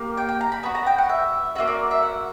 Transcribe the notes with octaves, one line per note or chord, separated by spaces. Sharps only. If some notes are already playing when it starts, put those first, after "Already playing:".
Already playing: A#3 G4
G5
G5
A#5
B5
B3 F#4 B5
A#5
G5
F#5
E5
A#3 C#4 F#4 E5
D5
E5
F#5